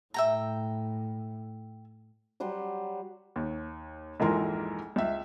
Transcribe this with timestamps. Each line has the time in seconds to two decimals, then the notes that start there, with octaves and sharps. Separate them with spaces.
0.14 A2 E5 G5 A#5
2.40 F#3 G3 F#5 C6
3.36 D#2
4.20 A#1 F2 G#2 E3 A#4 C6
4.96 C#2 E5